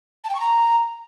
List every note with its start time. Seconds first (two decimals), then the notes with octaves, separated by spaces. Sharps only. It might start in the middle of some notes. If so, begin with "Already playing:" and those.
0.24 A5
0.30 G5
0.35 C#6
0.40 A#5